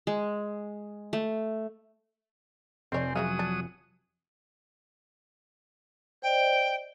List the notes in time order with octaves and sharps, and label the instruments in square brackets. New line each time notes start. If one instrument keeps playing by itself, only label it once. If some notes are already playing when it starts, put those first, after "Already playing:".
[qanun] G#3
A3
[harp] F1 G#5 [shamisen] D#3 C#5 D5 [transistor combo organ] C4
[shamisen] C#3 E5 F5 [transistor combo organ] F#3 D#6
[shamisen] D4
[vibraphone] C5 D5 D#5 [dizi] G5